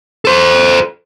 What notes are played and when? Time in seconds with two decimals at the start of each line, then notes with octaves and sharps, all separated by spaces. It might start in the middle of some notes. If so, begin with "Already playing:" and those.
0.25 A4 C5